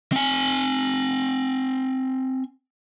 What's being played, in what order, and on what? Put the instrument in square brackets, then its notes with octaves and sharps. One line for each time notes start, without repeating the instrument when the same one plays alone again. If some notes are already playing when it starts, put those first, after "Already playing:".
[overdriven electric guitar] C4 G#5